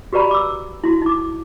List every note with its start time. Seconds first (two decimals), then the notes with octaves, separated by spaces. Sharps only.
0.13 F#4 G4 B4 D5 A#5 B5
0.31 D6 E6
0.84 E4 F#4
1.02 D#4 D6